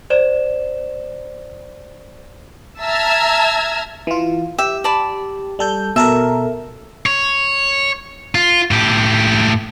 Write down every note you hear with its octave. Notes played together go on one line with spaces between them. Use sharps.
C5 D5 E7
E5 A5 A#5 E6 F6 G#6
E3 F4
G4 E5
D5 A5 B5
G3 A4 G6
B2 A4 A#4 E5
C#5
F4
A2 G4